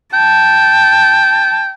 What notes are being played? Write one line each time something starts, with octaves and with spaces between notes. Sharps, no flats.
G5 A5